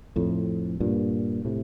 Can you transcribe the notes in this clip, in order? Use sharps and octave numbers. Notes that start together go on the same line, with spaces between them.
F2 A2
G2 A#2
A2 C3